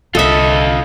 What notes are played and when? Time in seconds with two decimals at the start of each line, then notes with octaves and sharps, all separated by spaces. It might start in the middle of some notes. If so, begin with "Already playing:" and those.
0.15 C2 D3 F4 A4 D#5 E5